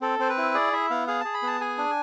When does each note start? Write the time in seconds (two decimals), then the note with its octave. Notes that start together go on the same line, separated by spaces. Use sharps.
0.01 C4 A4
0.19 C4 C5
0.29 B4
0.38 E4
0.55 G#4 D5
0.73 E4 E5
0.90 B3 F5
1.07 G#4 F5
1.21 G#4 A5
1.34 B5
1.43 B3 A5
1.61 G#4 G#5
1.78 D4